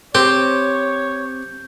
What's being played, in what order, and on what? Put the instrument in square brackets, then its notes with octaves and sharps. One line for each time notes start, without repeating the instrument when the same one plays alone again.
[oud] C4 [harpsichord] G4 [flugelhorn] C#5 [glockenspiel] G6